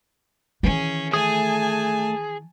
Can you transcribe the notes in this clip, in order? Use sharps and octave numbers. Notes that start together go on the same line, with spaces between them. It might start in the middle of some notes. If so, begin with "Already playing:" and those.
D#3 E3 C#4 G#4
A3 G#4 G#5 A5 D#6